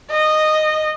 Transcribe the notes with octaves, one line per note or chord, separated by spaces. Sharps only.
D#5